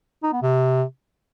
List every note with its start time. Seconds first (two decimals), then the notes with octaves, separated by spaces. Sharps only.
0.23 D#4
0.33 B3
0.42 C3